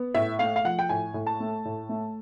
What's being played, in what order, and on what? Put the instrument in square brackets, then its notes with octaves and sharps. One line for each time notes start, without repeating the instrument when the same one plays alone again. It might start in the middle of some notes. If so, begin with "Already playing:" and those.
Already playing: [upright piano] B3
A2 E5
A3 F5
F5
F3 F#5
G5
A2 G#5
A2
A5
A3
A2
A3